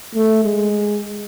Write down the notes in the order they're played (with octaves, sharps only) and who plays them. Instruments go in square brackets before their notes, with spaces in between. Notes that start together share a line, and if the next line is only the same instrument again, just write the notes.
[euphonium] A3
G#3